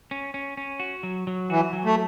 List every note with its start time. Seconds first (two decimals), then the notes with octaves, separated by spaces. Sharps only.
0.11 C#4
0.34 C#4
0.57 C#4
0.80 F#4
1.03 F#3
1.27 F#3
1.50 E3 F#4
1.73 F#3
1.85 A3